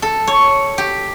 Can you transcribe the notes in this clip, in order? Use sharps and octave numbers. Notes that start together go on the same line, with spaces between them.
A4
C#5
G4